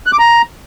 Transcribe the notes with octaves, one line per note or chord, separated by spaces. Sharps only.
F#6
D6
A#5